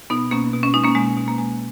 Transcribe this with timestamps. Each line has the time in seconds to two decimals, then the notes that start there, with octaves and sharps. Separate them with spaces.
0.10 B2 B3 D#4
0.31 B2 A#3 C#4
0.54 B2
0.63 C#4
0.74 G#3 D#4
0.84 A#3 C#4
0.95 B2 G#3
1.17 B2
1.28 A#3
1.38 G#3